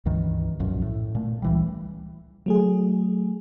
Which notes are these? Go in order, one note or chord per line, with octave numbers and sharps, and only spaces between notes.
C#2 G2 D#3 E3
B1 F#2 A#2 F3
A2
A#2 A3
C#2 E3 G3
F#3 A3 G#4